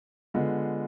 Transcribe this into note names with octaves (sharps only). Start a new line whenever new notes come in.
D3 G#3 B3 F4